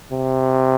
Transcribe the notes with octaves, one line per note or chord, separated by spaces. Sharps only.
C3